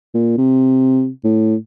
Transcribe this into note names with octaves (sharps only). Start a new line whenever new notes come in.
A#2
C3
A2